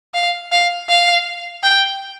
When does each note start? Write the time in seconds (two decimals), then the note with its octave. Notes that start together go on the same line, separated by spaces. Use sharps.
0.14 F5
0.52 F5
0.89 F5
1.63 G5